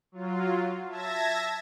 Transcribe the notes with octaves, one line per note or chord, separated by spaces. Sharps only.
F#3 F4
E5 A5 G#6 A#6